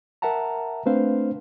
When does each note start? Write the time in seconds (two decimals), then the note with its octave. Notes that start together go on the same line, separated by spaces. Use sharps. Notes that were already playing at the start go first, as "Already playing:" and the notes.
0.22 A#4 E5 F#5 A5 A#5
0.86 A3 C4 D4 B4 C5 F5